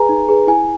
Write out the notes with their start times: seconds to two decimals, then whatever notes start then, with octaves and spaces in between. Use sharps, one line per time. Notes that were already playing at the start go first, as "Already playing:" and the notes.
Already playing: G#4 B4 G#5 A#5
0.09 D#4
0.28 G#4 B4
0.47 E4 G#5